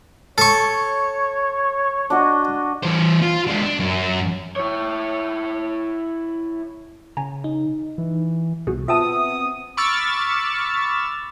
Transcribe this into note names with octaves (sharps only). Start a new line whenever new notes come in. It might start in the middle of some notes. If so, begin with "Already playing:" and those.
A4 C#5 C#6
D4 F#4 D#5
E3 C5
F4
G#3 D4
D4
F#2
E4 C#5
C#3 G#5 A#5
D#4
E3
C2 B2 F#4 G#4
B3 C4 F4 E5 G5 A5 D#6
B5 C#6 D6 E6 F6 A6